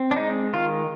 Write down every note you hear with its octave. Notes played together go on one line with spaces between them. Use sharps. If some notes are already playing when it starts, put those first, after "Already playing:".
Already playing: C4
D4
G#3 D#4
D#3 F4